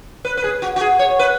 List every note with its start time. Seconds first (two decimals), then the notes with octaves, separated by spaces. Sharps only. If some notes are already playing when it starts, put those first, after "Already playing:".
0.25 B4
0.37 B4
0.44 G#4
0.62 F#4
0.76 F#4
0.81 G#4
0.99 C#5
1.19 B4